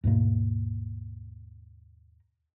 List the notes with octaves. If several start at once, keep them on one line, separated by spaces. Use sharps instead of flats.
D#2 G#2 B2 A#3